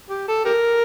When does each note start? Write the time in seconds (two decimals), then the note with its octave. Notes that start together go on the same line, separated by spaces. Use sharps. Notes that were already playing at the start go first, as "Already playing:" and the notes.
0.10 G4
0.28 A4
0.45 G4 A#4